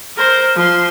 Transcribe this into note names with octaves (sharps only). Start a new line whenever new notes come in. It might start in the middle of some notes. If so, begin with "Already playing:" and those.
A#4 C5
F3 C6